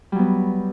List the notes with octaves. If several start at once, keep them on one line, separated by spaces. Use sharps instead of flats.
F#3 G3 B3